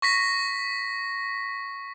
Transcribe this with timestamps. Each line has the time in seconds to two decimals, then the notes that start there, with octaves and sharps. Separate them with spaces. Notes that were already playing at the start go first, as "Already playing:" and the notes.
0.02 C#6 A#6 B6